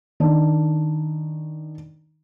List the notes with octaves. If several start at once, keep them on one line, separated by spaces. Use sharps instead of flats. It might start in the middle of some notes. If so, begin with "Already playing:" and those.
D#3 D4